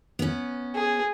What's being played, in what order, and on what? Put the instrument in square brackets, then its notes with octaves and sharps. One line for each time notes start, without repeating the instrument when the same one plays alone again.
[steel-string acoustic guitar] B3 C#4
[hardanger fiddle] G#4